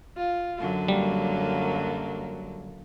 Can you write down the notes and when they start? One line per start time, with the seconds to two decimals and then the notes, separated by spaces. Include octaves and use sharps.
0.17 F4
0.60 F#2 D3 F#3
0.88 G3 A#3